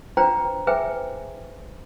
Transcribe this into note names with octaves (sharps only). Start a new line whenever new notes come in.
D4 F4 B4 C5 G5 A#5
G#4 B4 C5 E5 G5 G#5